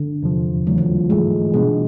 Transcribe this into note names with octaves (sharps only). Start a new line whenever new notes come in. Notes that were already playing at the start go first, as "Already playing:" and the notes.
Already playing: D3
E2 C3 F3
D#2 C#3 E3 F#3 A3
F3
G#2 E3 G#3 A3
B2 G3 G#3 B3 D4